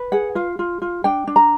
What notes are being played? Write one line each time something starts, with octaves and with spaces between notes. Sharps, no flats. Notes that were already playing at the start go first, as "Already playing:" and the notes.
Already playing: B4
G#4 F#5
F4 F5
F4
F4
D4 G5
D4
A#5